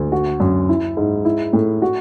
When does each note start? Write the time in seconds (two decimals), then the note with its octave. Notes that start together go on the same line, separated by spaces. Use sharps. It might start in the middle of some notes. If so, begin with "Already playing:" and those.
Already playing: D2
0.12 F#4
0.40 F#2
0.69 E4
0.97 G#2
1.25 E4
1.53 A2
1.82 F#4